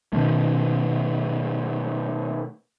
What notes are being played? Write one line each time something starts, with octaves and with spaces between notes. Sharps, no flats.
B2 D#3 A3